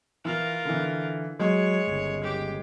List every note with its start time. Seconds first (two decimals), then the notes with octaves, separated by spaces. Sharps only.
0.25 E3 F4 A#4
0.65 D3 E3
1.39 F#3 G#3 C#5
1.87 G1 C#2
2.23 G4